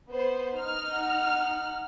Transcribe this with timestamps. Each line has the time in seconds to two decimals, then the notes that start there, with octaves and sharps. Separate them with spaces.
0.11 B3 C5
0.54 D#4 F6
0.94 F#5